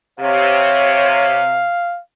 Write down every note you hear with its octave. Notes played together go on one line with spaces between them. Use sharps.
C3 C#5 F5